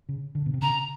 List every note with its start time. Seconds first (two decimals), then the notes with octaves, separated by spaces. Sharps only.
0.09 C#3
0.35 D3
0.46 B2
0.54 C3
0.61 C#3 A#5